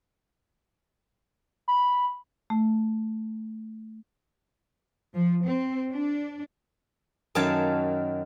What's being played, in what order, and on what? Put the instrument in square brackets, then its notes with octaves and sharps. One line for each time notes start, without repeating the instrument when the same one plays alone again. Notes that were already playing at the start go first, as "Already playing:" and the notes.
[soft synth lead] B5
[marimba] A3
[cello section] F3
C4
D4
[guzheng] F#2 D#3 F#3 C#5 F5 A5